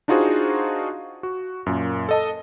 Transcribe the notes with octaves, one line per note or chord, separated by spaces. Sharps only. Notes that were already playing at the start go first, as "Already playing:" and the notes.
D4 D#4 F4 F#4 G#4 C5
F#4
F#2 A#2
A4 D#5 A5